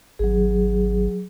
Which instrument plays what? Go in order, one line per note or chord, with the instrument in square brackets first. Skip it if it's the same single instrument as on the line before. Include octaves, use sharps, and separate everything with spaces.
[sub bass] G#1 [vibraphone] F#3 G#4